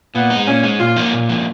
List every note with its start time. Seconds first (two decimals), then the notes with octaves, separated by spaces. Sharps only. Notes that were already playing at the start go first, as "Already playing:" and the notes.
0.15 A#2 B3
0.30 G#3 D#4
0.47 A#2 C#4
0.63 G#3 D#4
0.79 A#2 F4
0.96 F3 A#3 D#4
1.13 A#2
1.29 F3 A#3 D#4